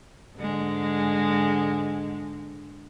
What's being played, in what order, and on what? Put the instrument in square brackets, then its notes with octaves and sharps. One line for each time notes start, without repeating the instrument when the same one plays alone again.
[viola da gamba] G#2 D3 G#3